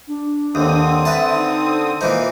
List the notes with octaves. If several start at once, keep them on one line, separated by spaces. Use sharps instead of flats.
D4
D#2 D3 C4 D#6
B4 E5 A5
D#4
A#2 E3 D#4 C5